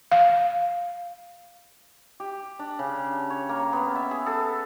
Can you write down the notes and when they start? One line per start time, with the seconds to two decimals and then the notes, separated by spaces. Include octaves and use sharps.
0.11 F5
2.20 G4
2.59 D4
2.79 C#3
3.30 C#5
3.49 A#3
3.73 B3
3.96 E5
4.11 G#4
4.26 A4